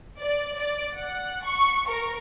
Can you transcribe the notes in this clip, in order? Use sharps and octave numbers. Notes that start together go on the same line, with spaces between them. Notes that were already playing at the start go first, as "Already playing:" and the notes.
D5
D5
F#5
C#6
A#4